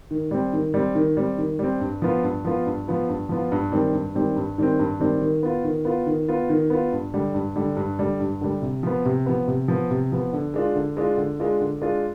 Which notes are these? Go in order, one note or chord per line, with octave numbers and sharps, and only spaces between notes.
D#3
G3 C4
D#3
G3 C4
D#3
G3 C4
D#3
G3 C4
G2
F3 B3 F4
G2
F3 B3 F4
G2
F3 B3 F4
G2
F3 B3 F4
G2
D#3 G3 C4
G2
D#3 G3 C4
G2
D#3 G3 C4
G2
D#3 G3 C4
D#3
B3 F4
D#3
B3 F4
D#3
B3 F4
D#3
B3 F4
G2
D3 G3
G2
D3 G3
G2
D3 G3
G2
D3 G3
C3
F3 B3
C3
F3 B3
C3
F3 B3
C3
F3 B3
D3
G#3 D4 F4
D3
G#3 D4 F4
D3
G#3 D4 F4
D3
G#3 D4 F4